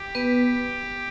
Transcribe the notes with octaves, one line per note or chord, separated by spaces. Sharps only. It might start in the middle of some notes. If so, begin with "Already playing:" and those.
Already playing: G4
B3 B4